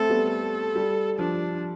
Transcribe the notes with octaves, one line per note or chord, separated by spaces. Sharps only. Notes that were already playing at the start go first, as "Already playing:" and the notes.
Already playing: A3 C4 A4
G3 B3
A4
G3
F3 D4